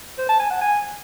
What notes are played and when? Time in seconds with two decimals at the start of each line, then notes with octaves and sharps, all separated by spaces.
0.18 C5
0.29 A5
0.39 G#5
0.50 F#5
0.61 G#5